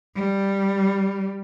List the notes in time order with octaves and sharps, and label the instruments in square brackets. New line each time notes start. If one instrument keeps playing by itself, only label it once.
[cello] G3